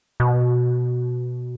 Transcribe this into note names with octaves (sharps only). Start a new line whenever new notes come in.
B2